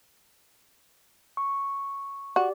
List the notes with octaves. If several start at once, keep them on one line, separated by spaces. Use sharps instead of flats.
C#6
F#4 G4 D5